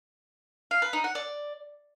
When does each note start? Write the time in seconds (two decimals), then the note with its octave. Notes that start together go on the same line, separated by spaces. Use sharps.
0.71 F5
0.82 B4
0.93 D#4
1.04 F#5
1.15 D5